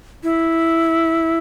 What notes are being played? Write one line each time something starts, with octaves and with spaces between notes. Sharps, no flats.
E4